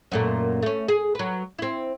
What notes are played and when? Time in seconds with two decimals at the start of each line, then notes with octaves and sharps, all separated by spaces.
0.12 F#2 A#2 A3
0.63 A3 C#4
0.88 G#4
1.15 F#3 B4
1.59 C4 E4